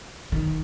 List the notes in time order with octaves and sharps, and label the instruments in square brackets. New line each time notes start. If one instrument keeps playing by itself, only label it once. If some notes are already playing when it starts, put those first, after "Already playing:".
[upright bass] D#3